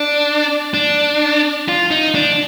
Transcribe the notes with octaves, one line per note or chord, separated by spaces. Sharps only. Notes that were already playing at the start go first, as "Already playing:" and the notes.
Already playing: D4
D4
F4
D#4
D4